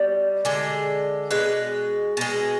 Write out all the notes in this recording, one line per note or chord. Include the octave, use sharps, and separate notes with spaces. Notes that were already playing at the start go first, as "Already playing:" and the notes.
Already playing: B2 G3
D3 G#3
B2 G#3 B4
B2 G#3